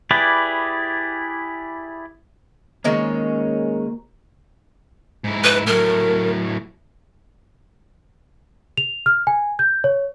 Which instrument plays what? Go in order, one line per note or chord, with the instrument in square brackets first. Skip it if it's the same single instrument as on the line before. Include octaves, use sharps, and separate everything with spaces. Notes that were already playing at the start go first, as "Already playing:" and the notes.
[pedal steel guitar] E4 G4 G#4 B4 D5
[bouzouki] D#3 G#3 C#4 [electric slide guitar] A#3 F#4 C5
[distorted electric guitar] G#2 E4
[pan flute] B4
[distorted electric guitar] A2 F#3 [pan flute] A#4
[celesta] F7
F6
G#5
G6
C#5